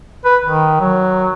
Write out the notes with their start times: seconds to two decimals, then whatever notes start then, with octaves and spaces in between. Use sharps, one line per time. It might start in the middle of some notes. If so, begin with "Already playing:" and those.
0.25 B4
0.44 D#3
0.80 F#3